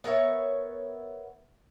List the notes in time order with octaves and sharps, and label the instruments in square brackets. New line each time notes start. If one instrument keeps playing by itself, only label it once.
[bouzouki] B3 A#4 C#5 E5